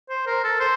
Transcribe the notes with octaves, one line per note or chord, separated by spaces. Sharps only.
C5
A#4
A4
C5